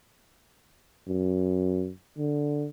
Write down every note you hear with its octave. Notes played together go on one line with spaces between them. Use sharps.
F#2
D3